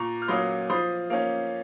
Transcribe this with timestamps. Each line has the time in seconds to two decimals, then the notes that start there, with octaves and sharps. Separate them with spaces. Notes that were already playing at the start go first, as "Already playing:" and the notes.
Already playing: A#2 A#5 C#6
0.22 F6
0.28 F#3 A#3 C#4 C6 D#6
0.69 F3 C6 D#6
1.10 A#3 C#4